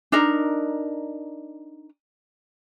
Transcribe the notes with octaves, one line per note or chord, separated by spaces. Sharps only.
D4 D#4 A#4